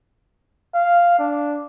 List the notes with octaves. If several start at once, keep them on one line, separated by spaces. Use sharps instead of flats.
F5
D4